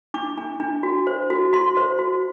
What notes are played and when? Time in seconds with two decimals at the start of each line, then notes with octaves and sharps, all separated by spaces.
0.14 D4 D6
0.38 D4
0.60 D4
0.83 F#4
1.07 C5
1.30 F#4
1.53 F#4 C6
1.77 C5
1.99 F#4